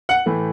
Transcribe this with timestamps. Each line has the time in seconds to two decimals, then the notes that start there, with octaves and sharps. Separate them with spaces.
0.09 F#5
0.26 A2 E3 A3